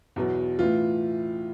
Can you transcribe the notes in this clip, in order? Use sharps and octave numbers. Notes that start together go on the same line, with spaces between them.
E2 B2 F#3
A2 E3 F4